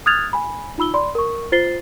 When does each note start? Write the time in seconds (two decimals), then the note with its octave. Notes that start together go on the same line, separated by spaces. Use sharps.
0.06 D#6 F6 F#6 G#6 A6 F7
0.33 G#5 B5
0.78 D#4 F4 B5 E6 G7
0.94 D5 B5 C6
1.15 A#4 C#6
1.52 F4 C5 A6 C7 G7